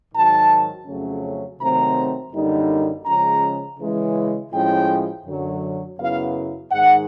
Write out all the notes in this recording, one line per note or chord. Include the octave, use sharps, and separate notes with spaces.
G#2 D#3 F#3 A5
F2 C#3 F#3 A3 C#4
C3 D#3 F#3 A3 C4 A#5
F#2 D3 G3 A#3 D#4
C#3 F3 G#3 C#4 A#5
C#3 E3 G#3
A2 F3 G#3 C#4 E4 G5
F#2 D3 F#3
F#2 C#3 F#3 B3 E4 F5
G#2 D#3 G#3 F#5